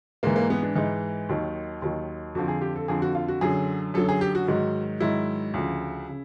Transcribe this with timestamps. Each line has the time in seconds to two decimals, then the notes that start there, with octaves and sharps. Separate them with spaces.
0.23 G#2 E3 A#3
0.36 A#3
0.50 B3
0.63 D4
0.76 G#2 E3 D#4
1.29 D#2 D#3 F#3
1.82 D#2 D#3 F#3
2.35 F2 D3 F3 F#4
2.48 G#4
2.61 G4
2.76 A4
2.88 F2 D3 F3 G#4
3.02 F#4
3.15 F4
3.28 F#4
3.41 F#2 D3 F#3 G#4
3.94 F#2 D3 F#3 A4
4.09 G#4
4.21 G4
4.35 F#4
4.48 G#2 D#3 F#3
5.00 G#2 D#3 F#3 E4
5.54 D2 C#3 F3
6.09 C#3